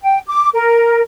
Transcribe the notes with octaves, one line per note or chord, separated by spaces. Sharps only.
G5
D6
A#4